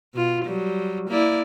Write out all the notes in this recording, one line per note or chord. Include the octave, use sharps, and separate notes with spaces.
B2 F4
F#3 G3
A#3 E4 D5